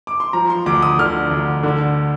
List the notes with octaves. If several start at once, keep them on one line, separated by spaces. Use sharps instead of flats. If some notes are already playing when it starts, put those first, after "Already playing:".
D6
C6
F3 A#5
C6
D2 D6
D#6
D3 F6
D2
D3